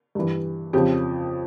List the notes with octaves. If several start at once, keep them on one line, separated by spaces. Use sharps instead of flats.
G2 E3
F2 C#3 F3 G4